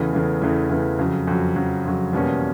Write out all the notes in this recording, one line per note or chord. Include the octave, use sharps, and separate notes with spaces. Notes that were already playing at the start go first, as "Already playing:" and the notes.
Already playing: E2 C#3 E3 A3
E2 C#3 E3 A3
E2 C#3 E3 A3
E2 C#3 E3 A3
F2 C#3 F#3
F2 C#3 F#3
F2 C#3 F#3
F2 C#3 F#3
E2 B2 G3 A#3 C#4